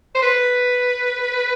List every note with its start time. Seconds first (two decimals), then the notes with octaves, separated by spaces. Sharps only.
0.15 C5
0.22 B4